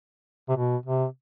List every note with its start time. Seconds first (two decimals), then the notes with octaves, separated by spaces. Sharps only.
0.49 C3
0.57 B2
0.86 C3